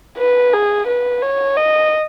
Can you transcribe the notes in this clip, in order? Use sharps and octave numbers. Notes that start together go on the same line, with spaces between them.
B4
G#4
B4
C#5
D#5